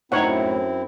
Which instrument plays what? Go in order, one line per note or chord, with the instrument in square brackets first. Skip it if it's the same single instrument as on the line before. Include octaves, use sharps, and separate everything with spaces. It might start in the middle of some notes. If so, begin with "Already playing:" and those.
[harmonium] F#2 C4 E4 [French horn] A2 [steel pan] D#4 C#5 F#5